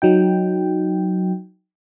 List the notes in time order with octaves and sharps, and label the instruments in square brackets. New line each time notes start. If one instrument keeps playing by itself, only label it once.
[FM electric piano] F#3 D#4 G5